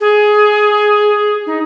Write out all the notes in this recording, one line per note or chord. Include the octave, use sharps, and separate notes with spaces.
G#4
D#4